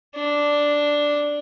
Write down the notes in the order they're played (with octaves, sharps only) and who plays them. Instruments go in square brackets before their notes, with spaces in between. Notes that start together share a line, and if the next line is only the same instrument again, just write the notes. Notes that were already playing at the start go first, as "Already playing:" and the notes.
[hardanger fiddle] D4